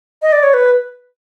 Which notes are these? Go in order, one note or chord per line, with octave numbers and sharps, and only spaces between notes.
D#5
D5
C#5
B4